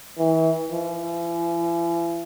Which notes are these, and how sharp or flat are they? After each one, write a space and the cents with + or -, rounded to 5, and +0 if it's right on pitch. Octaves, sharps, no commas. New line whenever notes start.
E3 -30
E3 +45